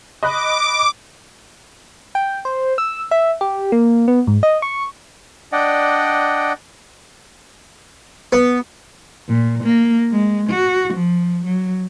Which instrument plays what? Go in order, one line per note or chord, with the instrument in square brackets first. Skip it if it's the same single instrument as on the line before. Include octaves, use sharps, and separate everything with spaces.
[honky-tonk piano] D#5 B5 F#6 [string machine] D6
[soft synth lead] G5
C5
E6
E5
G4
A#3
B3
G#2
D#5
C#6
[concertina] D4 D5 D#5 F#5 G5
[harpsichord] B3
[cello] A#2
A#3
G#3
F#4
F3
F#3